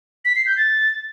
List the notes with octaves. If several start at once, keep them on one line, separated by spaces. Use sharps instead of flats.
B6
C7
G6
A6